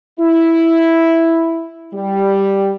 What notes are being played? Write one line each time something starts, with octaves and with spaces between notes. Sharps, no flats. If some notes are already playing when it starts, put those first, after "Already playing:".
E4
G3